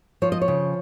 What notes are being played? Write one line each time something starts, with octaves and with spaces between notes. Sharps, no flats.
F3 C#5
D#5
C#5
C#3